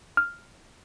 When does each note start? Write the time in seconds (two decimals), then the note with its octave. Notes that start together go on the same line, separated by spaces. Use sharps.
0.17 F6